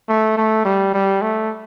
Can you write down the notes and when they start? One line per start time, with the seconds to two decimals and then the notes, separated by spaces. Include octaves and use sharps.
0.09 A3
0.37 A3
0.65 G3
0.94 G3
1.22 A3